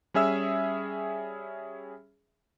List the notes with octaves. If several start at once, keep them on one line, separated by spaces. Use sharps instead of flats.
G3 C#4 G#4 E5 E6